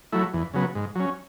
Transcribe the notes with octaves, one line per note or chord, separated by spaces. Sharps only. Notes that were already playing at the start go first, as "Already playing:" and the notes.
F#3 A3 E4
E2
C#3 F#3 B3
G#2
F#3 C#4